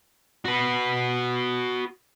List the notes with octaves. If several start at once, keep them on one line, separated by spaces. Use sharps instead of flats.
F#4 B4